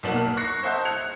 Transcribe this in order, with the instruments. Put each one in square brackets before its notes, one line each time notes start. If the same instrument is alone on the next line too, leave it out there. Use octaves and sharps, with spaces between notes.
[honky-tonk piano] B1 F#3 A#3 B3 A5 F#7
F6
C#6 F#6 A#6 C7 C#7
C5 D#5 E5 F#5 A5 G6
F#6 G#6 C#7 F7